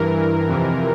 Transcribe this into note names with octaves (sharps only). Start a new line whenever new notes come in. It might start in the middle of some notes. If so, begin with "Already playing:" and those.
Already playing: G2 E3 A#4
F2 C3 E3